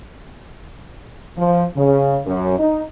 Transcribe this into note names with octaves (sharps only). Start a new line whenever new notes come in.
F3
C#3
F#2
D#4